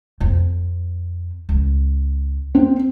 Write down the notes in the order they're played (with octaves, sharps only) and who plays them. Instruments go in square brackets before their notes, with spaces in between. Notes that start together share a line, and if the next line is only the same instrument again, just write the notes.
[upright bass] F2 C4
C#2
[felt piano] C4